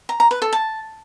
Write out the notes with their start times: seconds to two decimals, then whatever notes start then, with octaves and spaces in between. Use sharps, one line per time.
0.09 A#5
0.20 A#5
0.31 B4
0.42 A4
0.53 A5